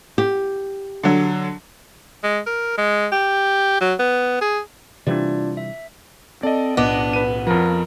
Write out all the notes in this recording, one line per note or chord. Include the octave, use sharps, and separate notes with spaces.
G4
D3 F#3
G#3
A#4
G#3
G4
F#3
B3
G#4
C3 E3 G3 D4 F4 D5
E5
C4 A4 D5 D#5
B1 A2 B3 D4 D#5 F#5 D6
B4 D#7
F2 F3 A#4